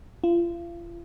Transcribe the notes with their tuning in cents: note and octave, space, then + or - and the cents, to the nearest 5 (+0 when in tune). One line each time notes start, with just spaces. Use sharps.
F4 -35